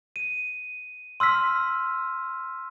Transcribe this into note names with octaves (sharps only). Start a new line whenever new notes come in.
D#7
C6 E6 F6 B6